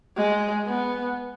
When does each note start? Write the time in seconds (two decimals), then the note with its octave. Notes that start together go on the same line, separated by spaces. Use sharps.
0.16 G#3
0.67 B3